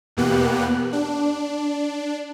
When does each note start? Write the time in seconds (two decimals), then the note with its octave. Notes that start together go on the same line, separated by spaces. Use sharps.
0.17 E2 B2 A#3 B3 G4 F#6
0.93 D4